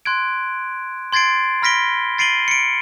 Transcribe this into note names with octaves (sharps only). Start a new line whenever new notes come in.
C6 F#6 G#6 D7
C6 G#6 A6 C7 D7
B5 F6 A#6 B6 D7 G7
A6 C7 D7 D#7 F#7 G7
C#7 D7